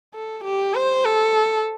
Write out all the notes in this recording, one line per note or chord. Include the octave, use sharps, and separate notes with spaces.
A4
G4
C5
A4